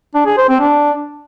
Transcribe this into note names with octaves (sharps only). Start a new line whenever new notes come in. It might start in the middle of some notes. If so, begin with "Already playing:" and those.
D4
G#4
C5
C4
D4